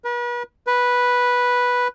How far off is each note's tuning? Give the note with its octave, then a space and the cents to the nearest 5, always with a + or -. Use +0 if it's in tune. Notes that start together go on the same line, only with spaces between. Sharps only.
B4 -40
B4 -5